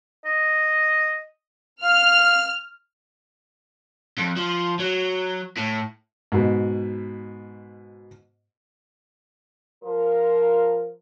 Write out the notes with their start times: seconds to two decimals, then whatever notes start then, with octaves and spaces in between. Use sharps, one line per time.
0.25 D#5
1.83 F5 F6
4.18 F2
4.36 F3
4.80 F#3
5.57 A2
6.32 G#2 B2
9.83 F3 A#4